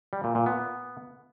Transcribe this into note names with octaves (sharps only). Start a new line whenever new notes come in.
G3
A#2
A#2
B3